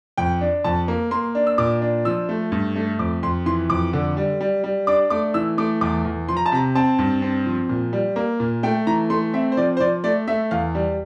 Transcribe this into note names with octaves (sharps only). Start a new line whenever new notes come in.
F2 G5
D4
F2 A5
A#3
A#3 C6
D4
E6
A#2 D6
D4
F3 E6
A3
G2
A3
F2 D6
F2 C6
E3 C6
F2 D6
D3
G3
G3
G3
D4 D6
A3 D6
E3 E6
A3 D6
E2 D6
E2
F3 C6
A#5
A5
C3 A#5
C4 A5
G2
C4
F3
A#2
G3
A#3
A#2
A3 G5
E3 A#5
A3 C6
C4 E5
C5
F3 D5
C5
F3 D5
A3 D5
A3 E5
E2 F5
G3